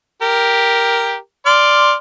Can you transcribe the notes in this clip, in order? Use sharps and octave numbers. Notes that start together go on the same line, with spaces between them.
G4 A#4
D5 C6 F6